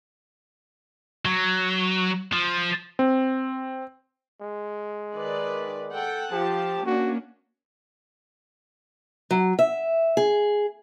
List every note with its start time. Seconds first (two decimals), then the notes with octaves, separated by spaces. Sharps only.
1.25 F#3
2.33 F3
2.99 C4
4.41 G#3
5.14 D#3 B4 D5
5.94 A4 F#5 G5
6.33 F3 G4 A5
6.86 A#3 C#4 D4 F#4
9.31 F#3
9.59 E5
10.17 G#4